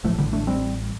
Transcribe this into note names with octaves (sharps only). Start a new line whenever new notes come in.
A1 A2 F3 A3
D3 G3
A3 D4
G3 C4